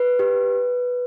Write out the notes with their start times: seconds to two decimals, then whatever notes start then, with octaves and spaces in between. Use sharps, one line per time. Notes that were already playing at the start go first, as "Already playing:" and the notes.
Already playing: B4
0.19 G4